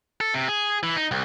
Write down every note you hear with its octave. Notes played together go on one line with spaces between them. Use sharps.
A4
C3
G#4
E3
D#4
C2